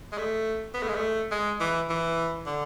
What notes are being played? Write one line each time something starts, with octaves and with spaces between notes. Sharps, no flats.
G#3
A3
B3
A3
G#3
A3
G#3
E3
E3
D3